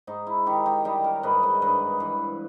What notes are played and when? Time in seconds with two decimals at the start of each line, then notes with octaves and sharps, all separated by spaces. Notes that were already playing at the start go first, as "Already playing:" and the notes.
0.07 G#2 D#4
0.27 E4
0.46 D#3 D#4 G4
0.66 D#4 G4
0.84 G3 D#4 G4
1.04 A#4 C#5
1.23 G#2 B4 D#5
1.43 B4 D#5
1.62 G2 B4 D#5
2.00 E3